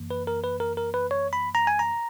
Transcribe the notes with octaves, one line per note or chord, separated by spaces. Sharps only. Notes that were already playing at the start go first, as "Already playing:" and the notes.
Already playing: F#2 E3 A#3
B4
A#4
B4
A#4
A#4
B4
C#5
B5
A#5
G#5
A#5